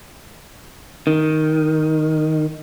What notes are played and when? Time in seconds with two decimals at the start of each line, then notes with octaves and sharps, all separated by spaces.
1.07 D#3